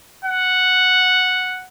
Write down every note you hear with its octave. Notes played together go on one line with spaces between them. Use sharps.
F#5